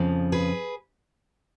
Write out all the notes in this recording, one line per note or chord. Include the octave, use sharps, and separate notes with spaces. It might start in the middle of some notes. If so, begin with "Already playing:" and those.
Already playing: F2 C#3 F3
G#4 B4